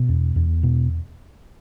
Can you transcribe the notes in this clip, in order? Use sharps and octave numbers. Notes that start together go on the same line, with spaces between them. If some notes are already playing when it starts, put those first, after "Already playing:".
Already playing: B2
E2
E2
B2